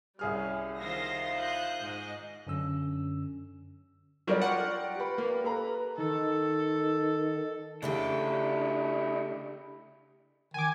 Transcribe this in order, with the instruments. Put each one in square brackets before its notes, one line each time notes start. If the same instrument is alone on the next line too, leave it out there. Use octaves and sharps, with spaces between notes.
[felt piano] C2 G#4 F6 [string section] G3 C#4
[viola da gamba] D#3 F4 C5 [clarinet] F5 [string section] A#6
[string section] D#6 F#6 G6
[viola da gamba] G#2 [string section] D#5
[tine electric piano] F#2 D3 C#4 E6
[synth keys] F#3 G3 [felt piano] F4 A#4 D5
[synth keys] F#5 [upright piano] G5 C#6 F6
[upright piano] G4 B4
[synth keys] A#3
[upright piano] A4 B4 A#5
[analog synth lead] D#3 [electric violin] A4
[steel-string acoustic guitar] C#3 A3 G4 [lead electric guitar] D4 E4
[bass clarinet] D#3 [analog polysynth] G#5 D6